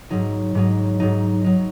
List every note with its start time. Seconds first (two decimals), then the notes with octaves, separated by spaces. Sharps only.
0.10 G#2 F#3 D#4
0.55 G#2 F#3 D#4
1.00 G#2 F#3 D#4
1.44 F#3 D#4